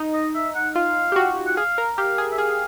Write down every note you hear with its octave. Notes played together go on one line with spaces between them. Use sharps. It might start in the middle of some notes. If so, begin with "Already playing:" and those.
Already playing: D#4
D#5
E5
F#5
F4 F5
G4
F#4
F#5
G#4 F5
A#4
G4 F5
G#4
E5
G#4 F5